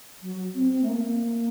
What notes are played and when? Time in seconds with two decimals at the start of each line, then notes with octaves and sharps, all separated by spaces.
0.22 F#3
0.55 C4
0.73 C4
0.83 A3
0.89 A#3